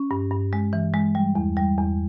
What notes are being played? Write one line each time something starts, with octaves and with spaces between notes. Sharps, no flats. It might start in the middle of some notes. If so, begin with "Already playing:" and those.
Already playing: C#4
G2
G2
G#3
E3
G#3
G3
E2
G3
E2